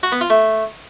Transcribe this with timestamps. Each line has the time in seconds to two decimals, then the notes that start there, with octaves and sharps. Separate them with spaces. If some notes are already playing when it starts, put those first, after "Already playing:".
0.03 F#4
0.12 B3
0.21 F4
0.30 A3